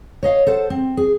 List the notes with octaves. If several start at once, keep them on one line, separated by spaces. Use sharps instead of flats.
C#5 D#5 F5
A4 C5 F#5
C4
G#4